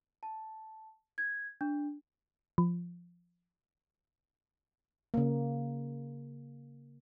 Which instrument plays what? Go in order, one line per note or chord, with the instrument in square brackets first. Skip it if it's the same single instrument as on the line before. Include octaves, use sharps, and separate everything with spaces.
[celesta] A5
G#6
D4
[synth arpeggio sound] F3
[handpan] C#3 A#3